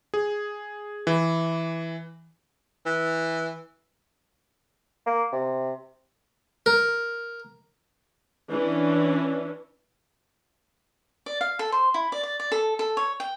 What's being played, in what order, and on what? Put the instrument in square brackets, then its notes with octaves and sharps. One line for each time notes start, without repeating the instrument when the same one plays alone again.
[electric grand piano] G#4
E3
[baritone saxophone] E3
[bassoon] A#3
C3
[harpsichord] A#4
[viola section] E3 C#4 D4
[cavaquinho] D5
F5
A4
C5
E4
D5
D5
D5
A4
A4
C#5
G5